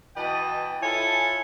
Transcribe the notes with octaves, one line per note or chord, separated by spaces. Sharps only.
B2 E3 B4 D#5 G5 A5
E4 F4 A4 C#5 G#5 A5